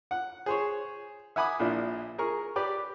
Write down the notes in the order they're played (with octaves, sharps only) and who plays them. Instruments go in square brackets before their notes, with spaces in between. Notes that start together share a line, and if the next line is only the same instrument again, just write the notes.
[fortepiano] F#5
G#4 C5 C#5
E5 F#5 G#5 B5 D6 D#6
A#1 A#2 D4 E4
G#4 A#4 C#6
G4 B4 D5